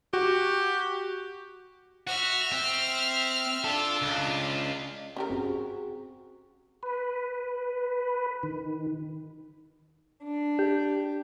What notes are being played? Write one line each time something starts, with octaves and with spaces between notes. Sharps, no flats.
F#4 G4
F#4 E5 F6
C4
D4 F4 A4
C#2
C#4 G4 A#4
C4 F#4 G#4
B4
D#3
D4
G4